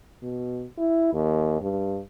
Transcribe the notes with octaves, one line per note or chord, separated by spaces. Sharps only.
B2
E4
D#2
G2